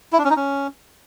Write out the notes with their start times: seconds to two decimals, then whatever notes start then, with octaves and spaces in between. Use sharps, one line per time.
0.13 E4
0.18 D4
0.24 C#4
0.30 D#4
0.36 C#4